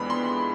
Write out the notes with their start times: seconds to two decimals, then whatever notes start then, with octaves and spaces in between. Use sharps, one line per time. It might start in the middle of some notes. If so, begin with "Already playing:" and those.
Already playing: F2 E3 G#3 B3 D4 B5
0.10 C6